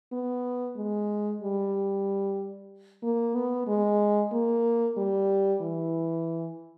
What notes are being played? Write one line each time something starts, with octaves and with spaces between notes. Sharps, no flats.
B3
G#3
G3
A#3
B3
G#3
A#3
G3
E3